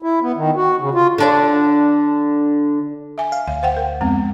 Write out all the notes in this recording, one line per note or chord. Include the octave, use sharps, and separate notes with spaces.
E4
B3
D#3
F#4
C#3
F4
D3 D4 D5
E5 G#5
F5
D2 F5
C5 F#5 G5
A#4
F2 G#3 B3 C4